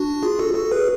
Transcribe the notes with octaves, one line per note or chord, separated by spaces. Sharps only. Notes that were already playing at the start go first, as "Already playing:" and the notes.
Already playing: D4 F#4
F4 G#4
F#4 A4
F#4 A4
G#4 B4